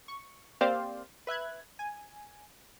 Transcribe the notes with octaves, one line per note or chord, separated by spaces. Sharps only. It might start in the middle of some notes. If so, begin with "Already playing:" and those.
C#6
A#3 C4 G4 C5 D5 F5
B4 E5 F#6 G#6
G#5